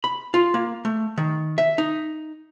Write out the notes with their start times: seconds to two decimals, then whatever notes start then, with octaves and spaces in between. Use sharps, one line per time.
0.04 B5
0.34 F4
0.54 A#3
0.85 A3
1.18 D#3
1.58 E5
1.78 D#4